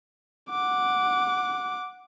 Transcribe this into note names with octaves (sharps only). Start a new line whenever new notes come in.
F#5 D6